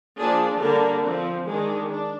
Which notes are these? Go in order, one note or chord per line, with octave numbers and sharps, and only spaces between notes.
F3 A#3 D4 G#4
D3 G3 A#3 D4 A#4
F3 C4
D#3 G#3 D4 G#4
D4